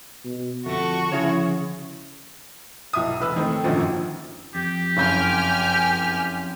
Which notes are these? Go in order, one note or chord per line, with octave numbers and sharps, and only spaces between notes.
B2
F2 D3 A3 F#4 A4 C#6
C#3 F3 E4 G#4 C#5
B1 E5 D#6
E1 B4 E6
D#3 A3 C4
G#1 F#2 A#2 D3 D#3 F3
F2 G4
F#1 G5 G#5 F6 G6